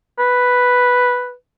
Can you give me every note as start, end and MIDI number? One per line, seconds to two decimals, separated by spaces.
0.19 1.33 71